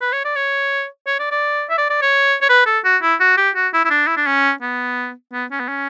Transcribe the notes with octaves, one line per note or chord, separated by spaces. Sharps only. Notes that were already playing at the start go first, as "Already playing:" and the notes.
B4
C#5
D5
C#5
C#5
D5
D5
E5
D5
D5
C#5
C#5
B4
A4
F#4
E4
F#4
G4
F#4
E4
E4
D4
E4
D4
C#4
B3
B3
C#4
B3
C#4